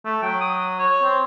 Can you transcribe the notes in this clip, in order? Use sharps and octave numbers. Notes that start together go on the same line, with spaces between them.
A3
F#3 G5
D#6
C#5
C4